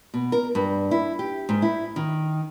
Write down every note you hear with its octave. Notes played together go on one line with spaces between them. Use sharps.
B2
A#4
G2
E4
G4
G#2
E4
D#3